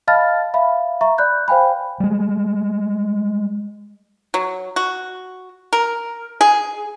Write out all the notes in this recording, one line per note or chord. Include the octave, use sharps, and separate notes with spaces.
D#5 F5 A5 B5 F6 A6
E5 F5 B5
E5 A#5 C#6
D5 B5 F#6 G6
C5 F5 G5 G#5 B5
G3 G#3
F#3
F#4
A#4
G#4